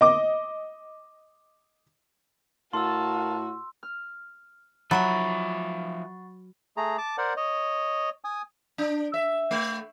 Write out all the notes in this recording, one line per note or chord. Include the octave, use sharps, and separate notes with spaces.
D#5 D6
A2 F#4 A#4 F5 A5 C6 E6
F6
F3 F#3 E5 F#5 B5 C#6 A6
A3 G#4 A#5
A5 D6
A#4 C5 D5 F#5
C#5 D#5
G#5 D#6
D4
E5
A3